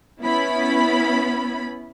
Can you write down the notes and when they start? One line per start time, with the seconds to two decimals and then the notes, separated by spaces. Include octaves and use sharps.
0.22 B3 C#4 E4 B5